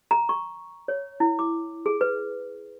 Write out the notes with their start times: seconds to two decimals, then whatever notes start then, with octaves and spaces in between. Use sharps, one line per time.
0.11 A#5
0.29 C#6
0.88 C#5
1.20 E4
1.39 D6
1.86 G#4
2.01 B4